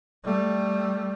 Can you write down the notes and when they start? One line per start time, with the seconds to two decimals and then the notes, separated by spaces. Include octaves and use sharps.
0.24 G3 A3